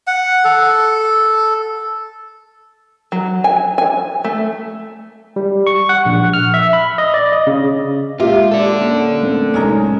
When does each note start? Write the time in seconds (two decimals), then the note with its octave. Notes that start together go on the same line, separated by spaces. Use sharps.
0.07 F#5
0.45 A4
3.12 F#3
3.44 G#5
3.78 G#5
4.24 A3
5.36 G3
5.67 C#6
5.89 F#5
6.05 A#1
6.33 F6
6.54 E5
6.73 B5
6.98 D#5
7.14 D5
7.32 D#5
7.47 C#3
8.20 A#2 G#3 F4 G4 A#4 E5
8.51 A4 D5
8.81 A#3 C#4
9.23 A3 B3 C4
9.54 C2 F#2 A2 G#3 C#4 D#4 A#4